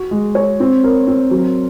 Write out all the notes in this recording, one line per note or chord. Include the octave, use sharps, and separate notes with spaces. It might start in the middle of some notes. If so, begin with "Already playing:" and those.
Already playing: F#4
G#3
C#5
C4
A#4
C4
F#3